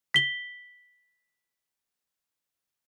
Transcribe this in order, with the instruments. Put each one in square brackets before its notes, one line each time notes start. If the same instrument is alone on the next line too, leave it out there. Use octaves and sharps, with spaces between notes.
[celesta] B6 G7